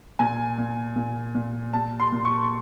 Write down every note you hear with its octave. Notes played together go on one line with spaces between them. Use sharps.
A#2 G#5
A#2
A#2
A#2
A#2 A5
C6
A#2
C#6